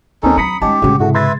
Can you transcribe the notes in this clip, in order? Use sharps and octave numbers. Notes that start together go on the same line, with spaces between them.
D2 D#3 C4 C#4 D#4 A4
F#3 C4 A#5 B5 D#6 B6 C#7
G#3 C#4 D#4 G4 D#5 G#5 A5
A2 C#3 G#3 C#4 F#4 G#4
G#2 C3 E4 F#4 G#4 A4
B4 E5 C6 G#6 A6